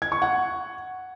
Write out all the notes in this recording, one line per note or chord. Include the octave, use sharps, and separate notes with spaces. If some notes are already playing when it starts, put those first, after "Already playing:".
G#6
C#6
F#5